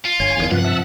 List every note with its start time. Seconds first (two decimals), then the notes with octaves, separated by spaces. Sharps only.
0.05 F4
0.20 G1 C#5 G#5
0.37 E2 G2 D#3
0.51 G2 C3 F3 F4 B4 F#5
0.64 E5 A5 E6